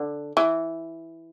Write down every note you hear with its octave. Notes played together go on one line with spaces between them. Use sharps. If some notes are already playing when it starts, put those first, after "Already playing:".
Already playing: D3
E3